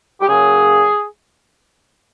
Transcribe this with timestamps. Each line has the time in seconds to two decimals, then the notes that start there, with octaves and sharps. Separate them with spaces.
0.21 G4
0.28 C#3 F#3 A#3 G#4